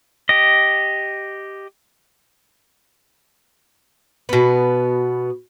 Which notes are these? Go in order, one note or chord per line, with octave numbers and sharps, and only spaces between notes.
G4 D#5
B2 B3